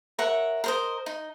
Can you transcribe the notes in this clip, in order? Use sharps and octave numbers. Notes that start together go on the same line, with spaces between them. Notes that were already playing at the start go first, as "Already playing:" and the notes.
A#4 C#5 E5 F#5
A#4 C5 D#5
D#4